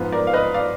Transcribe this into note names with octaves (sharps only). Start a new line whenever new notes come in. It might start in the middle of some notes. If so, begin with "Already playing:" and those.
Already playing: G#2 F3 B3
A#4 D5
F5
B4 D#5
D5 F5